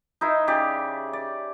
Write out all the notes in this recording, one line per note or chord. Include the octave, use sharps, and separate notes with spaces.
D#4 E4 C5
C#3 G4 D5
D5